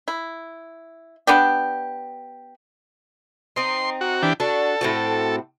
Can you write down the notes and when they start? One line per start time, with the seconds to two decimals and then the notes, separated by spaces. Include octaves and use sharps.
0.08 E4
1.27 B3 D4 G4
3.56 C4 D#4 C6
4.01 F#4
4.22 E3 D4 G4
4.40 D4 F#4 A4
4.81 A2 C4 F#4